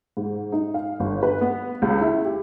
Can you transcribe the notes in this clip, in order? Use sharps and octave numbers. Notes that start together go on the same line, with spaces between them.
G#2
D#4
F5
G1
B4
B3
C#2
E4
G4